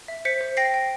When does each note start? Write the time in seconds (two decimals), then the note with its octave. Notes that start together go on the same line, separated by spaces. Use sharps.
0.08 E5
0.25 C5 B6 C#7
0.41 C5
0.57 G5 A#6 C7
0.74 G5